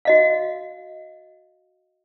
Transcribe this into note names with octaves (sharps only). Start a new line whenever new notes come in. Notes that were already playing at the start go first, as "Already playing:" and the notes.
F#4 D#5 F5